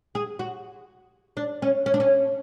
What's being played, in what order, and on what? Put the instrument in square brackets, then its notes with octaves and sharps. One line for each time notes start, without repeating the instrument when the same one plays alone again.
[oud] G#4
F#4
D4
C#4
C#4
D4
C#4